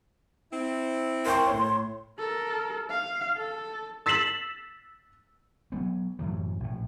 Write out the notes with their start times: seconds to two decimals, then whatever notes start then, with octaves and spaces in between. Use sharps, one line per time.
0.52 C4 E4
1.26 A#4 G5 C6 C#6
1.47 A2 C#5
2.19 A4 A#4
2.90 F5
3.37 A4
4.06 E6 A6 B6 C7 E7 F#7
5.72 F#3 G#3 B3
6.19 F#2 A2 E3 F#3
6.60 A#1 A2